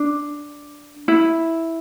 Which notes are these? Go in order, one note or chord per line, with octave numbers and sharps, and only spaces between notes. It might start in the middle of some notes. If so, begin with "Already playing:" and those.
Already playing: D4
E4